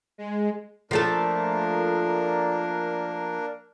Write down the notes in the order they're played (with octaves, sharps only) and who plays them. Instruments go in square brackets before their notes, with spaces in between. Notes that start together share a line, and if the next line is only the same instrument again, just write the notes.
[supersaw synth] G#3
[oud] F3 A3 A4 [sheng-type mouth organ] A#3 D4 A#4